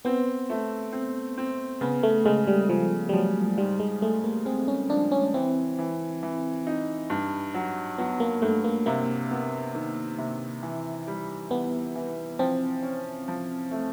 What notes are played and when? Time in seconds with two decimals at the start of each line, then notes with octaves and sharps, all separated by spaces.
0.05 B3 C4
0.50 A3
0.93 C4
1.38 C4
1.81 C#3 B3
2.03 A3
2.25 C#3 G#3
2.47 G3
2.69 C#3 F3
3.09 G3
3.13 F3 F#3
3.57 G#2 G3
3.80 G#3
4.02 G#3 A3
4.24 A#3
4.45 G#3 C4
4.68 C#4
4.89 F3 D4
5.12 C#4
5.34 E3 C4
5.78 E3
6.23 E3
6.67 D#4
7.10 G2
7.54 F#3
7.98 F#3 B3
8.20 A#3
8.42 G2 A3
8.64 A#3
8.86 C3 A#3
9.31 B3
9.75 D#3
10.19 C3
10.63 E3
11.07 G3
11.51 E3 B3
11.96 E3
12.39 F3 C4
12.83 C#4
13.28 F3
13.71 A3